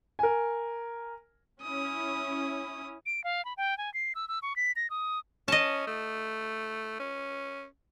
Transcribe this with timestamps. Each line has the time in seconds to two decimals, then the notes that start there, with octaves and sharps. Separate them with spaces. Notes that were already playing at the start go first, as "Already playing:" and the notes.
0.19 A#4 G#5
1.62 C#4 E4 D#6
3.06 D7
3.24 F5
3.45 B5
3.57 G5
3.78 G#5
3.94 C7
4.15 E6
4.28 E6
4.42 C#6
4.56 B6
4.76 A#6
4.90 D#6
5.48 C#4 D#5 A5
5.87 A3
7.00 C#4